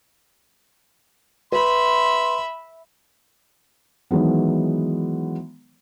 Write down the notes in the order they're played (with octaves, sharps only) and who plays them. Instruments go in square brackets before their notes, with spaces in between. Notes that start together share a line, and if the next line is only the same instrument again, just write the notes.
[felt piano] B4 [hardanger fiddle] E5 B5 [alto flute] C6
[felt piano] D#3 E3 F#3 G#3 B3